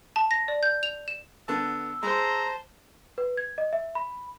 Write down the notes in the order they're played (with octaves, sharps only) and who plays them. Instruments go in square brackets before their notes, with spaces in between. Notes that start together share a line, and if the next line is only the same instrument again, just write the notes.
[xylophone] A5
A#6
D5
G6
F7
E7
[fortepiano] D3 B3 A5 [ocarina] E6
[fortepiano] G#3 [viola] C5 A5 [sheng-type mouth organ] A#5
[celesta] B4
G#6
D#5
E5
B5